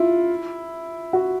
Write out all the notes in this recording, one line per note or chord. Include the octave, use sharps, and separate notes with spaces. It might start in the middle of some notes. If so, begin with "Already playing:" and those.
Already playing: E4 F4
F#4